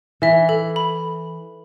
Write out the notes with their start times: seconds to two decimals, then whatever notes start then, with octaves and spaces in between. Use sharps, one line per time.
0.22 E3 E5
0.49 A4
0.76 B5